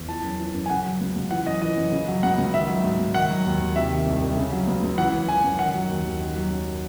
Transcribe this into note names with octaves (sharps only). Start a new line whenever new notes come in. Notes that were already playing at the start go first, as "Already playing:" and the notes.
Already playing: E2
E3 A5
F#2
E3
F#2
G#5
C#3 F#5
F#3
C#2
C#2
E3 F#5
F#2 D#5
E3 D#5
F#2
C#3
F#3
C#2 F#5
C#2
D#3 E5
F#3
G#2
G#2
D#3 F#5
F#3
D#2
D#2
C3 E5
D#3
C2
C2
C#3
F#3
C#2
C#2
E3 F#5
F#2
E3 G#5
F#2
D#3 F#5
F#3
D#2
D#2
D#3
F#3
F#2